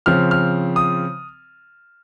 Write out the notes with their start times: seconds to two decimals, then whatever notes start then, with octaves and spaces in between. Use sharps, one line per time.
0.06 C#3 F3 C4 F6
0.31 F6
0.76 D#6